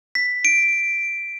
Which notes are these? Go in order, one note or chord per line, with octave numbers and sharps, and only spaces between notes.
B6
D7